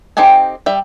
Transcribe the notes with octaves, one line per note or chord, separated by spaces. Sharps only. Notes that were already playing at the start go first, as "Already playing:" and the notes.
C4 D#4 G4 A4 G#5
G3 E5